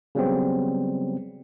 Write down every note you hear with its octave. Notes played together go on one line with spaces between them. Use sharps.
C#3 F#3 G3 B3 C4